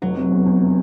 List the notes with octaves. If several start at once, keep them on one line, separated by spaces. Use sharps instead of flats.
F1 F#3
C3
E2
E2
C3